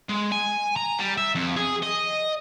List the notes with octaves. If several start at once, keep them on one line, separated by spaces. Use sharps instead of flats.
G#3
G#5
A#5
G3
E5
F2
G#4
D#5